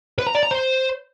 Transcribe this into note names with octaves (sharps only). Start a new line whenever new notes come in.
B4
A#5
D5
A#5
C5